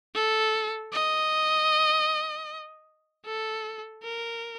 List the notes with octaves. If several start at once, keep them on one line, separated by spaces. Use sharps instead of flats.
A4
D#5
A4
A#4